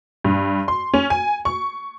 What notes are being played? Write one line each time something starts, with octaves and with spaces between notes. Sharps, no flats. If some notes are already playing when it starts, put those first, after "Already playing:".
G2
C6
C#4
G#5
C#6